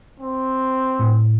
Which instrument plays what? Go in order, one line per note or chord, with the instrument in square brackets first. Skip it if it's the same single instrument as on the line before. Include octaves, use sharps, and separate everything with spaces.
[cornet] C4
[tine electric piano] A2